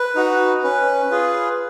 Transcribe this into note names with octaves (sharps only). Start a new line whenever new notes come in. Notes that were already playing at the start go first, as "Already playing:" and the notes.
Already playing: B4
D#4 F#4
C#4 B4
F4 G#4